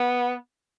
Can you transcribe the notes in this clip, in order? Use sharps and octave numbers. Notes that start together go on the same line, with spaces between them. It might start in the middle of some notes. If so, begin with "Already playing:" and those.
Already playing: B3